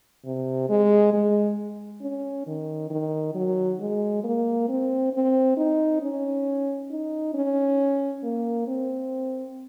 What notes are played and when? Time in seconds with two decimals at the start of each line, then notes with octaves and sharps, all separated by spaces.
0.25 C3
0.69 G#3
1.14 G#3
2.02 C#4
2.47 D#3
2.90 D#3
3.35 F#3
3.80 G#3
4.24 A#3
4.69 C4
5.13 C4
5.57 D#4
6.01 C#4
6.90 D#4
7.34 C#4
8.23 A#3
8.67 C4